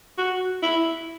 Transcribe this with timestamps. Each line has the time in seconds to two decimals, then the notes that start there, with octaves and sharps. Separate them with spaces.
0.18 F#4
0.63 E4